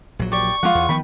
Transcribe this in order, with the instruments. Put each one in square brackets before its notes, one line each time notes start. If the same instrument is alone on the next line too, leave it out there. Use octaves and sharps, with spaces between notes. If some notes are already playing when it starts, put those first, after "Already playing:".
[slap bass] A#1 F#3
[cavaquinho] G4 D5 [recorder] C#6
[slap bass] F3 G#3 [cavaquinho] F4 D5 F#5
[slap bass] E2
[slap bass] D#3 F3 B3 [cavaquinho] G5 B5